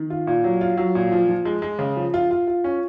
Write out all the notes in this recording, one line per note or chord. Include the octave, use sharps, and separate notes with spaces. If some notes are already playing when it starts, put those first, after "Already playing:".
Already playing: D#3
F4
A#2
F#3
F4
F#3
A#2
F3
F3
G#3
G#3
C#3
F3
F4
F4
F4
C#4